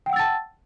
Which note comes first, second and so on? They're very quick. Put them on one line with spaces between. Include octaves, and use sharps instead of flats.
G5 F#5 E6 A6 A5